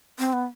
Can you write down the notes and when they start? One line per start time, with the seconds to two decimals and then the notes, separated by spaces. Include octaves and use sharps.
0.19 C4
0.33 B3